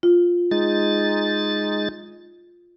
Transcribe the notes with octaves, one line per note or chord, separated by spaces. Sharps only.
F4
G#3 D#4 A6